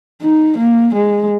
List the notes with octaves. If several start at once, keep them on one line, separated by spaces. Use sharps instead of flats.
D#4
A#3
G#3